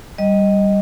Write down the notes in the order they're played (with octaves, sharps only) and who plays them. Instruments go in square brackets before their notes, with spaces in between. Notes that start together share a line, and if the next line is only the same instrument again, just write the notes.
[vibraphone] G3 D#5